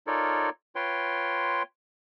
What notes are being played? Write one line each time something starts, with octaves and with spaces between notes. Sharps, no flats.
D#4 F4 A4 A#4 C#5 D5
F4 B4 C#5 G5 C6